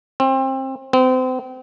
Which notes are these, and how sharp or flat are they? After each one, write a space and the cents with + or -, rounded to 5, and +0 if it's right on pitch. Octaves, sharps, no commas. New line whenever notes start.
C4 +25
C4 -35